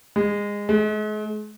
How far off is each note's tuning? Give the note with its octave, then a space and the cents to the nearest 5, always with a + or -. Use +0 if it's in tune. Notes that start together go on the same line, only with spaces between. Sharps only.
G#3 -20
G#3 +40